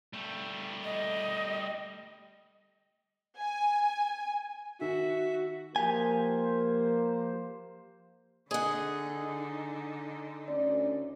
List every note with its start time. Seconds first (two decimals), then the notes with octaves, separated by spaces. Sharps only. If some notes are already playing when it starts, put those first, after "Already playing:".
0.13 G3 A3
0.84 D#5
3.39 G#5
4.81 D#3 F#4 E5
5.76 F3 A#3 G4 C5 G#5
8.51 D3 D#4 G#4 D#5 F#5
10.49 D2 C#4 D5